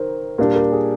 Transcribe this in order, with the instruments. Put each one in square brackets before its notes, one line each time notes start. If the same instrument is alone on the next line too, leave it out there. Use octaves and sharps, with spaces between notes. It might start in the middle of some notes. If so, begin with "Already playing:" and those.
Already playing: [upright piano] D#3 [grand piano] A#4 C5
[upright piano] A#2 G3 D4 [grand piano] A#4
[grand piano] A#4
G#4